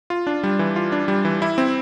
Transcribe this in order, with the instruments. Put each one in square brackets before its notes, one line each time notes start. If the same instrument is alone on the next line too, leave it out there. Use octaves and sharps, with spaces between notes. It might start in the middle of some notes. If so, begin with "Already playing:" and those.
[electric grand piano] F4
D4
G3
E3
F4
D4
G3
E3
E4
C4